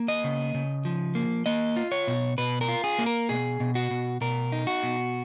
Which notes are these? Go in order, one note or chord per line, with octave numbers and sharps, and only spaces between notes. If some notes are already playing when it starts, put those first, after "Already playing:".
Already playing: A#3
D#5
C#3
C#3
F3
A#3
A#3 D#5
F4
C#5
B2
B2 B4
A#4
F4
G#4
A#3
A#4
B2 G#4
B2
F#4
B2
B2 A#4
D#4
F#4
B2